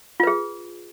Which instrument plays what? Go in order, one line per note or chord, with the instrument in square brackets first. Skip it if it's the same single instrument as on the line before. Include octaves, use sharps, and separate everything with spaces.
[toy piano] F4
B4
G#4